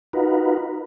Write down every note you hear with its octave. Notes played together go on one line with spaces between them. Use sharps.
D#4 F4 F#4 A#4 B4